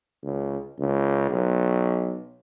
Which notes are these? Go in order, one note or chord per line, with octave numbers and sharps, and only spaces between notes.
C#2
C#2
B1